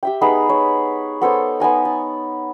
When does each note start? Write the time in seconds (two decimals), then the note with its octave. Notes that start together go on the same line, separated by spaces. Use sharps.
0.03 G4 E5 G5
0.21 B3 D#4 G#4 B4
0.49 C#5
1.21 B3 A4 C5 C#5
1.60 B3 D#4 G#5 A#5
1.85 A5